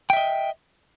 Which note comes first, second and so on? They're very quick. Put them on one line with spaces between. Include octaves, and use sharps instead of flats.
G5 E5 D#5